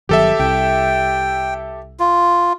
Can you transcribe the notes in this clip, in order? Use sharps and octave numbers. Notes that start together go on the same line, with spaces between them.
G1 D#3 F#3 G4 A4 E5
C2 G5
F4